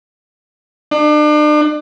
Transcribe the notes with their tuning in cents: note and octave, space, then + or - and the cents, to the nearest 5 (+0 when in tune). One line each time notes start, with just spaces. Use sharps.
D4 +35